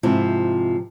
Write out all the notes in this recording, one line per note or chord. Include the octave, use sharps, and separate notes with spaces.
G#2 C3 F3 C4 E4